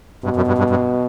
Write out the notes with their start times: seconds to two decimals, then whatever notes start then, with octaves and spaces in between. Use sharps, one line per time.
0.24 G2 B2
0.36 F#2
0.48 G2
0.58 G2
0.70 G2